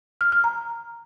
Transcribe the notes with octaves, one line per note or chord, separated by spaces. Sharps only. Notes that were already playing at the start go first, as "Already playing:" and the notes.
F6
F6
A#5